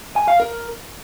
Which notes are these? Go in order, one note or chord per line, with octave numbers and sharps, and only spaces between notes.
G#5
F5
A#4